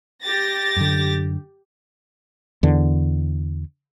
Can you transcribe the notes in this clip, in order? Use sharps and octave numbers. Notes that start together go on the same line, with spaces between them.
G4 A6 A#6
F#2 D3
E2 D3